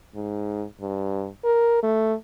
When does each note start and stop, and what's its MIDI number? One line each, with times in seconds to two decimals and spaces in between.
0.15 0.65 44
0.81 1.29 43
1.45 1.79 70
1.83 2.14 57